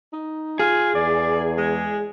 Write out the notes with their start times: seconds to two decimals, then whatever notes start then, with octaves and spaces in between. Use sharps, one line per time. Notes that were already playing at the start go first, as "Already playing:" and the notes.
0.13 D#4
0.59 F4 G#4
0.95 E2 D5
1.58 G#3